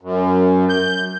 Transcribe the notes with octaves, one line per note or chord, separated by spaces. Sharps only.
F#2
G6